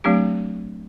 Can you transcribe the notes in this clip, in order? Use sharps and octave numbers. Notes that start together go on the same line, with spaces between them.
F#3 A3 C4 D4 G4